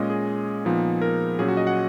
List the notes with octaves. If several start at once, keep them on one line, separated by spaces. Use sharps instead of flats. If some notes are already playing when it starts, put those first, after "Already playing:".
Already playing: A#2 G#3 C#4 D#5
G#4
A#2 F3 B3 D#4
A#4
A#2 F#3 C#4 G#4
F#4
D#5
F#5